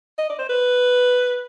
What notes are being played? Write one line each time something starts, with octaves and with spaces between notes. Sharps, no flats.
D#5
D5
C5
B4